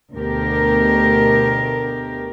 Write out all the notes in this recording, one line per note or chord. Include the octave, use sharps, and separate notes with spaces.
D2 B2 G4 A#4